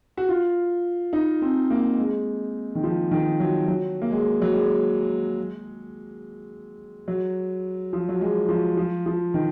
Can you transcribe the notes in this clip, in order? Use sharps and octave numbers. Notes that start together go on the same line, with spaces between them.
F#4
F4
D#4
C4
A#3
G#3
D#3
F3
D#3
F#3
F#3
A#3
G#3
F#3
G#3
F#3
F3
F#3
G#3
F3
F3
F3
D#3